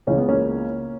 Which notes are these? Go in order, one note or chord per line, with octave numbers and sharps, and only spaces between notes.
C#2 C#3 E3 C#4
B3
A#3 C#4